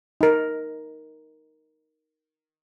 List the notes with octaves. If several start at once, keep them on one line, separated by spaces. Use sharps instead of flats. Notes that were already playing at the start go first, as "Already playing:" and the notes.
D#4 A#4